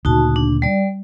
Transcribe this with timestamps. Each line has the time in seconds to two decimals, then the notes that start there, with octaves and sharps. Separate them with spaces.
0.05 D2 A#2 C#3 D#4 F#4 A5
0.36 D4
0.62 G3 D5